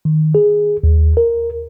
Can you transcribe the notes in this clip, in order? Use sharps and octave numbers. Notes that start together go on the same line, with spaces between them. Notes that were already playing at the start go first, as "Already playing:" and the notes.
D#3
G#4
D#2
A#4